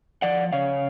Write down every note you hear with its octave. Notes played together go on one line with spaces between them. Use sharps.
F3 D5 F#5
C#3 C#5 F5